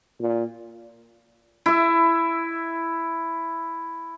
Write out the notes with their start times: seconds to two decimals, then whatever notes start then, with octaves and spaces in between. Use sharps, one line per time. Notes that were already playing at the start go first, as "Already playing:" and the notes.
0.20 A#2
1.66 E4 E5